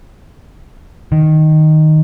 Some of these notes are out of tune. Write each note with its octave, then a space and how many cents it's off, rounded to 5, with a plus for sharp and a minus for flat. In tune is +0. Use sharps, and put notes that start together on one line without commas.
D#3 -5